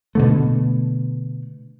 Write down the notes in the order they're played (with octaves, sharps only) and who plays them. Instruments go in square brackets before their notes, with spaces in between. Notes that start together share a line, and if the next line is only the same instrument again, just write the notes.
[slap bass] B2 D3 A3